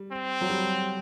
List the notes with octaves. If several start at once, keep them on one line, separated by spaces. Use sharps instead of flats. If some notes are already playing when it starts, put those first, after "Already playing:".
Already playing: G3
C4
F#3
G3